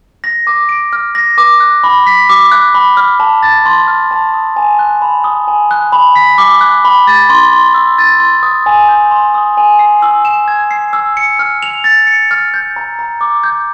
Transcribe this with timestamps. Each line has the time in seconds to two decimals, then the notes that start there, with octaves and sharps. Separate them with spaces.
0.24 A#6
0.47 D6
0.69 D7
0.93 F6
1.15 A#6
1.38 D6
1.60 F#6
1.84 B5
2.07 B6
2.29 D6
2.52 F#6
2.75 B5
2.97 F6
3.20 A5
3.43 A6
3.66 C6
3.88 F6
4.11 A5
4.34 D#6
4.56 G#5
4.79 F#6
5.02 B5
5.24 D#6
5.48 G#5
5.71 F#6
5.92 B5
6.15 B6
6.38 D6
6.61 F#6
6.85 B5
7.07 A6
7.29 C6
7.52 C6
7.74 E6
7.98 A6
8.20 C6
8.43 D#6
8.66 G#5
8.89 G6
9.11 C6
9.34 D#6
9.57 G#5
9.79 C7
10.02 E6
10.25 E7
10.48 G#6
10.71 C7
10.93 E6
11.17 C#7
11.39 F6
11.63 F7
11.84 A6
12.07 C#7
12.31 F6
12.54 G6
12.76 A#5
12.99 A#5
13.21 D6
13.44 G6